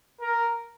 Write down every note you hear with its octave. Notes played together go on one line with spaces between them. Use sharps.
A#4